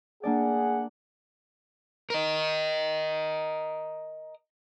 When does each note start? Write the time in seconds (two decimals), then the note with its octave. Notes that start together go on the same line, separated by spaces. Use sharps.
0.23 A#3 D4 G#4 D5 F#5
2.10 A#4 D#5